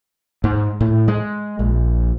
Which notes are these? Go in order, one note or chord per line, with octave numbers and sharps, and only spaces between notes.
G#2
A2
G#3
A#1